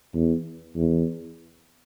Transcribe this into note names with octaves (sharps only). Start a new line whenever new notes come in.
E2
E2